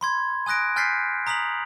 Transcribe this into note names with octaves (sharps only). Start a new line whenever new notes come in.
B5 C6 G#6
G#5 D#6 F#6 A#6 D7
G#5 F6 G6 A6 B6 C7
A#5 D#6 B6 F7 F#7